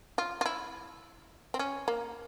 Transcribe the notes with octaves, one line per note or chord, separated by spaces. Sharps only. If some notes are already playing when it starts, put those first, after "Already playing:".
F4
F4
E4
C4
C#4
A#3